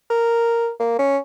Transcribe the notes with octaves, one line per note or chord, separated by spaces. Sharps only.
A#4
A#3
C#4